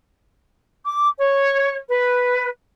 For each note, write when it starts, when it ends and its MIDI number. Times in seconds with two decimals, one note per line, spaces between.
0.85 1.07 86
1.19 1.75 73
1.89 2.48 71